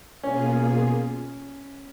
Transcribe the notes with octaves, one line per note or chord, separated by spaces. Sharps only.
B2 A#3 C#4 F4 G#4